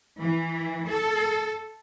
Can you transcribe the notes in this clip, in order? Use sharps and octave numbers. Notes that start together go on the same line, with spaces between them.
E3
A4